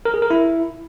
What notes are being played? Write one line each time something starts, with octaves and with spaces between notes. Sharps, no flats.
A#4
G#4
A#4
E4